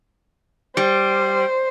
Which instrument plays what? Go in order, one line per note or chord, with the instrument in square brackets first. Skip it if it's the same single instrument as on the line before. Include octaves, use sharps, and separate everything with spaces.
[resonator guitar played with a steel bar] G3 [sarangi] C5